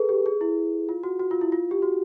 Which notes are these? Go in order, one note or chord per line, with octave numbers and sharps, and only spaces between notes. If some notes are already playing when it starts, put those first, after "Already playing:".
Already playing: G#4 A4 B4
G4
G#4
E4
F4
F#4
F#4
F4
E4
F4
G4
F#4